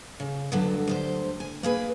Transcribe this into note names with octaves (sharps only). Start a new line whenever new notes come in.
C#3
D2 G2 D3 F#3 A4
D2 G4 C5
G#5
A#3 G#4 B4